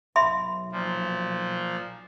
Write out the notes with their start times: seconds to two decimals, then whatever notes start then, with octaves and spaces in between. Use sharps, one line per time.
0.16 B1 E5 B5 C6
0.72 A#2 F3